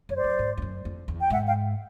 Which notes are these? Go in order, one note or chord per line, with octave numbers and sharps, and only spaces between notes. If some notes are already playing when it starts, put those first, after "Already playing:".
F#2 C#5
C5 D5
F#2
G#2
F2
F#2
F2
E2
G5
G#2 E5 F#5
F5 G5